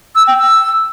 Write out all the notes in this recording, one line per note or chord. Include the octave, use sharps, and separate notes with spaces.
E6
G5
E6